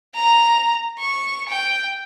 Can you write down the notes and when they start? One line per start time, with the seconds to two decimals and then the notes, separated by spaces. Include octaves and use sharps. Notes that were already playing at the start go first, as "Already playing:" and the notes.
0.15 A#5
0.99 C#6
1.49 G5